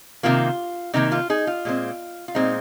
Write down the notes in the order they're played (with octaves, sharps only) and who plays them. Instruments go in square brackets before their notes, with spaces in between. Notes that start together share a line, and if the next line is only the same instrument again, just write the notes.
[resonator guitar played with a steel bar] C3 D#3 A#3 F4
C3 D#3 A#3 D#4
F4
D#4 G#4
F4
A#2 G#3 C4
F4
A#2 G#3 C4 D#4